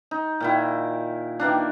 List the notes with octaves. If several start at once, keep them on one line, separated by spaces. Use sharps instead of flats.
D#4
A#2 D#3 E4
D#3 E3 A#3 D4